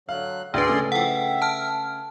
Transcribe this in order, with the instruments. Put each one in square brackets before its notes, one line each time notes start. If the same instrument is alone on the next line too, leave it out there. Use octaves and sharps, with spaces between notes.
[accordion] D3 F#3 F#6 [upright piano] F5
[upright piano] D2 [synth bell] D4 B4 [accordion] G#4 D5 C6
[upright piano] C#3 A3
[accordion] E3 F3 A4 [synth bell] F#5 G5
[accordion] E5
[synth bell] A5 F6